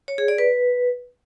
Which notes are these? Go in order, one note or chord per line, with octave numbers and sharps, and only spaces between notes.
C#5
G#4
D5
B4